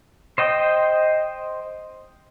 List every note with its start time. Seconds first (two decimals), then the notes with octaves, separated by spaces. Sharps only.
0.38 C5 D#5 G5